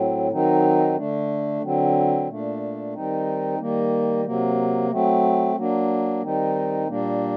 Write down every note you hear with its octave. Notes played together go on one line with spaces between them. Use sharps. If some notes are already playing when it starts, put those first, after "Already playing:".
Already playing: A2 F#3 C4
D#3 F#3 C4 D#4
D3 A3 D4
D3 F#3 C4
A#2 A3 D4
D#3 G3 C4 D#4
D#3 G3 A#3
C3 F#3 A#3
F#3 A3 C4
F#3 A#3 D4
D#3 G3 C4 D#4
A#2 G3 A#3 D4